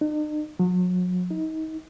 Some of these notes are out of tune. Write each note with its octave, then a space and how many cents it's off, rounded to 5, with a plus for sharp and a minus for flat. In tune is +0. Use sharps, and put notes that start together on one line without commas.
D#4 -45
F#3 -35
D#4 +30